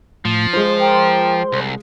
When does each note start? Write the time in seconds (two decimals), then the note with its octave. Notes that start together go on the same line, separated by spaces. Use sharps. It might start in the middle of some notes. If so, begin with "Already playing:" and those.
0.25 A2 F3
0.53 G#3 F4 C5
0.79 A#4 G5 D6
1.52 C2